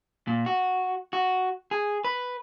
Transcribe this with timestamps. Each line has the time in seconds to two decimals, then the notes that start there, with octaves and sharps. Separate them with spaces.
0.27 A#2
0.46 F#4
1.13 F#4
1.71 G#4
2.04 B4